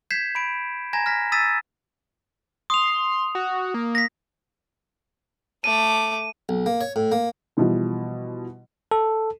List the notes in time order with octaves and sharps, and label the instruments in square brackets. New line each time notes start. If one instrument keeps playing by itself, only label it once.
[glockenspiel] G6 G#6 B6 C7 E7
B5 D7
G#5 A#5 G#6 A#6 E7
F6 A#6 B6
D#6 E6 A6 B6 D#7 E7
[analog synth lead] C6 [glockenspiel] D#6 F7
[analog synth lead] F#4
A#3
[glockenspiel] A#6 B6
[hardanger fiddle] A3 D6 [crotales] D#7
[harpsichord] B1
A#3
C#5
A2
A#3
[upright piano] B2 E3 F3 G3
[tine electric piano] A4